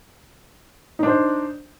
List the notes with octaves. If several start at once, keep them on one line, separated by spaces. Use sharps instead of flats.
D4 D#4 C5